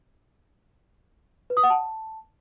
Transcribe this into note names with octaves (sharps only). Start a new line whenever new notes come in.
B4
D#6
F#5
A5